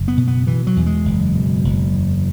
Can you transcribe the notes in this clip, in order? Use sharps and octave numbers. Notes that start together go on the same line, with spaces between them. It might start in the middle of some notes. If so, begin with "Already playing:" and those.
Already playing: F#1
B3
B2
B3
B2 E3
F#3
E2
G#3
F#1
B2
F#1
E2